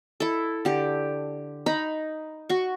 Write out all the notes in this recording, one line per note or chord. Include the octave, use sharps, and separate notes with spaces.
E4 A4
D3 G4
D#4 A#5 B5
F#4 C#6